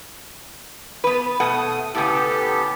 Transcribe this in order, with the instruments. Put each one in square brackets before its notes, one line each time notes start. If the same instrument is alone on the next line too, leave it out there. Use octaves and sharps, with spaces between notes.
[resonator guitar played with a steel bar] B3 B4
[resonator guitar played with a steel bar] B2 A3 F#5 [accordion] D#6
[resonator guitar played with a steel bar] A2 C#3 [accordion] B3 G4 A4